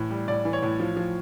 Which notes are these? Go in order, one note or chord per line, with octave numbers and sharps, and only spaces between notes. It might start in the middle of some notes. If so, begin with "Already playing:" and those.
Already playing: A2 E3
G3
A2 D5
E3
C#5
A2
F3
F3